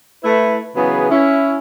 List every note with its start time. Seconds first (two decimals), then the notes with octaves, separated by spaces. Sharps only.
0.23 A3 E4 B4
0.76 C#3 E3 F#3 B3 G#4 B4
1.10 C#4 E4